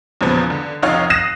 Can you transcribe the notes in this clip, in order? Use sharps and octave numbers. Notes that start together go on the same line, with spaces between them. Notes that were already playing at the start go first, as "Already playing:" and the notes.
E2 A#2 C#3 F3 B3
D3
F1 C#2 D#4 F4 C#5 F5
D#6 F#6 A#6 C7 D#7 E7